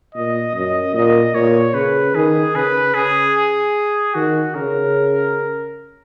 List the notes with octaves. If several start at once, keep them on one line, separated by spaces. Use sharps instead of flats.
A#2 D#5
F#2 D#5
A#2 D#5
A#2 C#5
C#3 B4
D#3 G#4
C#3 B4
C#3 G#4
D#3 F#4
C#3 A#4